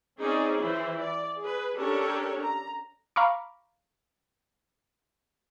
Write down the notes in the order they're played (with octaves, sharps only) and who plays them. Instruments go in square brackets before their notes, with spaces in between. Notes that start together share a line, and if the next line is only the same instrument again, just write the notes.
[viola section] C4 C#4 D#4 G#4 C5 D5
E3 E4 C5
D5
G#4 B4
C#4 D4 G4 A4 A#4 C#5
A#5
[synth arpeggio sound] F5 A#5 B5 C#6 D6